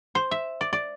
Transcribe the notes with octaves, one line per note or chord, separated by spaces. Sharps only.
C5
E5
D5
D5